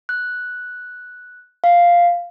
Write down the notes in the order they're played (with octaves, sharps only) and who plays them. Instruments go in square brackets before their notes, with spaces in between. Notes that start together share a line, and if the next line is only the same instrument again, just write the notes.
[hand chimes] F#6
F5